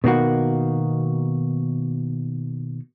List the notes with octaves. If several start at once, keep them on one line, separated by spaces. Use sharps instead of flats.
B2 D#3 A#3 F#4